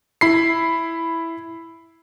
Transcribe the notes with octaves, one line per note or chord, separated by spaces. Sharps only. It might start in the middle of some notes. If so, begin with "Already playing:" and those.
E4 B5 C7